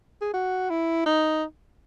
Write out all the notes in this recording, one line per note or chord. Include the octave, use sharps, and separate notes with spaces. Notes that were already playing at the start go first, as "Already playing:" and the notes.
G#4
F#4
E4
D#4